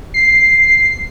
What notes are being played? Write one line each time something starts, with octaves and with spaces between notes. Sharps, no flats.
C7